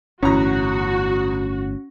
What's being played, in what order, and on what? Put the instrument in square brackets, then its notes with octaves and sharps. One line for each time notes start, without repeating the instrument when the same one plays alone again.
[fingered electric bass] G1 A2 [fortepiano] E2 A#5 [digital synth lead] C#4 [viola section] F#4